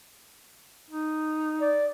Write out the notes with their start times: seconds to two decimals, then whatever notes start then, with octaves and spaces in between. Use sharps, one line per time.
0.91 D#4
1.61 D5